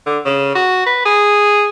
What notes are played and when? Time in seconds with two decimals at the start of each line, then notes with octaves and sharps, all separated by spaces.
0.06 D3
0.25 C#3
0.55 F#4
0.86 B4
1.05 G#4